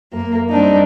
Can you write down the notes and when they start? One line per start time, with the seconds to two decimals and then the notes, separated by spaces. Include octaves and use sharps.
0.13 F#2 A#3
0.50 G3 C4 D4 D#4